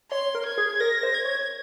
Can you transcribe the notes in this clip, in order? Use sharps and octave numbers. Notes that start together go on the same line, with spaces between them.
C#5 C6
A#4
G#6
G#4
A#4 A#6
C5
G#6
C#5